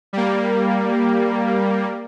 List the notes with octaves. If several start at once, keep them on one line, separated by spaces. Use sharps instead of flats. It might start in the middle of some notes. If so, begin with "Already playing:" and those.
G3 A#3